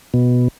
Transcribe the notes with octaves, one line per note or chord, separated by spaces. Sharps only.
B2